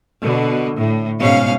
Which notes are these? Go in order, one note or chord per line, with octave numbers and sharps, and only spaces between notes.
B2 D3
A2
G#2 B2 C#4 F5